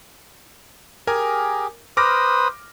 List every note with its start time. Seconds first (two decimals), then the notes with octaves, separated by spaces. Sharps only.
1.07 G4 G#4 A#4 G#5
1.97 B4 C5 D6 D#6 F6 A#6